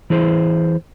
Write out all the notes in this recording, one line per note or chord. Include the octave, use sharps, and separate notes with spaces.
E3 E4 G#4 C5